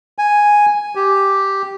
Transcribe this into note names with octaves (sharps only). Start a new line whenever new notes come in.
G#5
G4